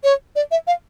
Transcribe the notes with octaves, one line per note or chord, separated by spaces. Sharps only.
C#5
D5
E5
F5